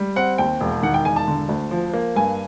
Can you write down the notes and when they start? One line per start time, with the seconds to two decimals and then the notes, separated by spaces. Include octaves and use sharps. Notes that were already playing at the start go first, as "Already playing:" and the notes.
Already playing: G3
0.16 C4 F#5
0.38 D#2 G5
0.60 E1
0.83 D#3 F#5
0.94 G5
1.05 E1 G#5
1.16 A5
1.27 D3
1.49 D2
1.71 F3
1.93 A#3
2.16 G2 G#5